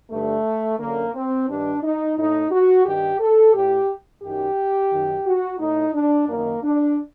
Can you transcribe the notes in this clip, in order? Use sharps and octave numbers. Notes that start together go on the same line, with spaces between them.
G2 D3 A3
F#2 D3 A#3
C4
G2 D#3 D4
D#4
A2 D#4
F#4
G2 D#3 G4
A4
A2 G4
F#2 D#3 G4
F#2 D#3
F#4
A2 D#4
D4
F#2 D#3 A#3
D4